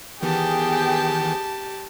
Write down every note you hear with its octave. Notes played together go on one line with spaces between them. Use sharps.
D#3 E3 B3 G4 G#4 G5 A5